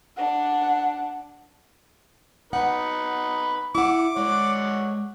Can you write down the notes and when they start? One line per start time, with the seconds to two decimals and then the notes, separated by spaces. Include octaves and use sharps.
0.17 D4 F#5
2.53 B3 D#4 B4 F#5
3.75 E4 F#5 D6
4.17 G#3 C#5 D5 F#5